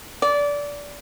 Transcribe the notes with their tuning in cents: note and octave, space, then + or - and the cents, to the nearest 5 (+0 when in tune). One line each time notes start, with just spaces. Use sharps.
D5 -20